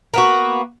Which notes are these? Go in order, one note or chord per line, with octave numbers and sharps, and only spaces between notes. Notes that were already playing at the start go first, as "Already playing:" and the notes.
A#3 B3 F#4